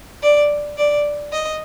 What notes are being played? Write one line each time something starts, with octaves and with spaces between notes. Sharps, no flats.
D5
D5
D#5